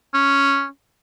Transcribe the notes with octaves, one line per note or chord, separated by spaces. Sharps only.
C#4